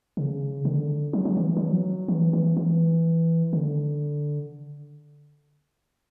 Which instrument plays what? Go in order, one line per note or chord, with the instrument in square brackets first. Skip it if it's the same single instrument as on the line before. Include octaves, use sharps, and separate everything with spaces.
[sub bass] C#3
D3
F#3
F#3
E3
F#3
E3
F#3
E3
E3
E3
D3